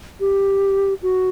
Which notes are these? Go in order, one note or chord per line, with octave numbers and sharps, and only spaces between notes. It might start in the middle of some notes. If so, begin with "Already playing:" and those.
G4
F#4